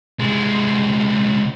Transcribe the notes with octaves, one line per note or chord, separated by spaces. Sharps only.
C2 G#3